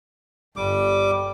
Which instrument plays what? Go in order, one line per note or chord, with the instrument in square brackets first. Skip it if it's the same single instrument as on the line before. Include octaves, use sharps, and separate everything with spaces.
[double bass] G1 [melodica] G3 D6